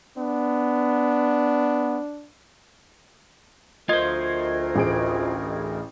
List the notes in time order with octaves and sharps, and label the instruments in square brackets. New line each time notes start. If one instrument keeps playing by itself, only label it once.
[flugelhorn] B3 [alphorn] D4
[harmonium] D2 A3 A#4 [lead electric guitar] F4 C5 [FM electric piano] D#5 G#6
[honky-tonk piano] A1 G#4 D7